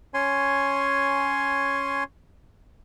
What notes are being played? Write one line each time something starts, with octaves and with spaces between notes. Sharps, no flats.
C#4 C#5 G#5 C6